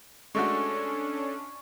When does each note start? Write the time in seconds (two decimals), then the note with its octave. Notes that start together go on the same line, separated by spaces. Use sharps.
0.35 G#3 A3 C#4 D4 F#4 A4 C#6